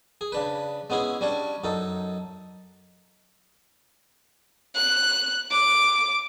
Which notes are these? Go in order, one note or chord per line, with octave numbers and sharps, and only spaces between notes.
G#4
C#3 D4 B4
G#3 B3 C#4 E4 G#4
G3 C#4 D4 C#5
F#2 D#4 A4
F#6
D6